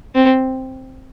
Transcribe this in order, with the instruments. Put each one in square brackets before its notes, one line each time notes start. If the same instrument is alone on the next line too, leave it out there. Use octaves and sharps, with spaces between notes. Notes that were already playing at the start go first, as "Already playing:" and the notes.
[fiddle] C4